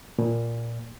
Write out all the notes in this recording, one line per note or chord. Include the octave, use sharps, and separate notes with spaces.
A#2